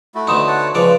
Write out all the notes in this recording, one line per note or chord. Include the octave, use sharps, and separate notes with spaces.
A3 E4 F#4
D2 B3 D#4 C6 D#6 E7
C#5 F#5 A5
C#3 F3 G#3 B4 D5